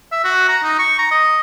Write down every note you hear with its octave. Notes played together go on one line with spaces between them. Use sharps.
E5
F#4
A#5
D#4
C#6
A#5
D#5